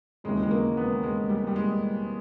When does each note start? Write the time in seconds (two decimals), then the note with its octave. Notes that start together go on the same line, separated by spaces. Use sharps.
0.24 E1 D#2 C#3 E3 G#3
0.43 G#3
0.51 A#3
0.77 B3
1.03 G#3
1.29 G3
1.47 G3
1.56 G#3